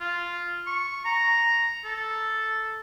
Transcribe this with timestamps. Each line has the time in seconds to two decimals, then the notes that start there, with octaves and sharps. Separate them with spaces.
0.01 F4
0.67 C#6
1.05 A#5
1.85 A4